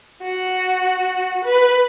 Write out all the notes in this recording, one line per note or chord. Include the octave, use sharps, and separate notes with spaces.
F#4
B4